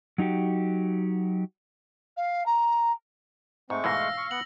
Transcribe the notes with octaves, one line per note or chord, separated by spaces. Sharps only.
F#3 D#4 F#4 G4
F5
A#5
G#2 G#3 A3 C4 C#6
G#2 B2 E3 F5 E6 A#6
C#6
B3 F#5 F#7